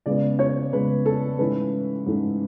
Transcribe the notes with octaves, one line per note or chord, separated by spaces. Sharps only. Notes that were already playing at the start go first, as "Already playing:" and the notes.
C#3 G#3 B3 D5
C#5
C#3 G#3 B3 B4
A4
G#2 E3 A3 C#4 B4
G#2 E3 A3 C#4